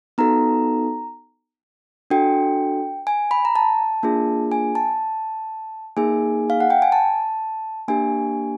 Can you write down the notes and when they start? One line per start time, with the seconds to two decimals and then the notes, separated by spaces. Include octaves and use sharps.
0.18 B3 D#4 F#4 A4 A#5
2.10 D4 F#4 A4 G5
3.07 G#5
3.31 B5
3.45 A#5
3.56 A5
4.03 A#3 D4 F4 G#4
4.52 G#5
4.75 A5
5.97 A#3 D#4 G#4 G#5
6.50 F5
6.60 F#5
6.70 G5
6.82 G#5
6.92 A5
7.88 A#3 D4 G4 G#5